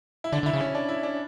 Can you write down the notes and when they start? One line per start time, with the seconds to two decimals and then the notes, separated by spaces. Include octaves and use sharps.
0.24 E4
0.32 D3 D4
0.43 D3
0.46 E4
0.53 C#3
0.61 C#4
0.75 D4
0.89 E4
1.03 D4